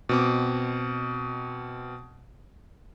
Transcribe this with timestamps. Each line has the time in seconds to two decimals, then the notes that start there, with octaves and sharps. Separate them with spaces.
0.09 B2 C4 D6